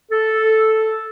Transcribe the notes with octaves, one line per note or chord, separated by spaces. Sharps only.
A4